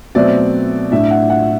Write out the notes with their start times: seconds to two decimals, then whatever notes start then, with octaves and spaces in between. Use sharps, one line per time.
0.15 B2 F#3 A3 C4 D5
0.91 A2 F#3 A3 D4 E5
1.11 F#5
1.30 F#5